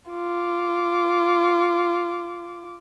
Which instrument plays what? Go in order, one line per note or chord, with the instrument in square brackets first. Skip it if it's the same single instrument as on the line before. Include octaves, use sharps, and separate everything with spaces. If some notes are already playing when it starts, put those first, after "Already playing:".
[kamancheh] F4 D6